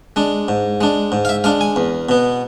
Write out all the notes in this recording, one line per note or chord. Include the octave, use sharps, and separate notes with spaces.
G#3 D4
G#2
G#3 D4
G#2
F5
E5
G#3 D4 F5
G#5
E2
B2 B3